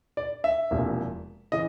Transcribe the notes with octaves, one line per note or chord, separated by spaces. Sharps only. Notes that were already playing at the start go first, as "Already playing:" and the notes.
D5
E5
E1 E2 C3 F3 A#3
C#3 E3 D#5